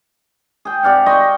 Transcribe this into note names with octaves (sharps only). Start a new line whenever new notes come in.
G#4 G5
C3 D5 F5 F#5
D#5 G5 C6 C#6